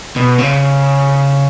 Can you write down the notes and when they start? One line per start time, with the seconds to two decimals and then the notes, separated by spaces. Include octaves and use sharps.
0.16 B2
0.38 C#3